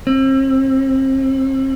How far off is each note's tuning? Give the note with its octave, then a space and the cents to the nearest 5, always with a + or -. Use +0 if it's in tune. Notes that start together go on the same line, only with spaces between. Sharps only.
C4 +35